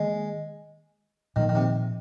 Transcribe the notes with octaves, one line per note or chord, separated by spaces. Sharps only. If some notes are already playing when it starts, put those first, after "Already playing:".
Already playing: D#3 G#3 A#3
A#2 D#3 F3 A#3
D#3
C3